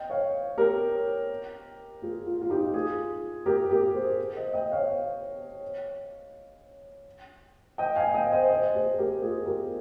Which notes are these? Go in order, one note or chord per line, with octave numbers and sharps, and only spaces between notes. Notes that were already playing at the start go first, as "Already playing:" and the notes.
Already playing: D#5 G5
C#5 F5
G4 A#4
F4 G#4
F4
F4
D#4 G4
F4 G#4
G4 A#4
G4 A#4
G#4 C5
C5 D#5
D#5 G5
C#5 F5
D#5 G5
F5 G#5
D#5 G5
C5 D#5
C5 D#5
G#4 C5
G4 A#4
F4 G#4
G4 A#4